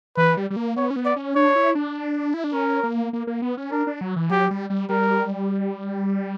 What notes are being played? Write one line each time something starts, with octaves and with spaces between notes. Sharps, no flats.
E3 B4
G3
G3
A#3
B3 C#5
C#4
B3
D5
C#4
D4 C#5
E4
D4
E4
D4
C#4 A#4
A#3
A#3
A#3
B3
C#4
D4 A#4
D4
F#3
E3
F#3 G4
G3
G3
G3 A#4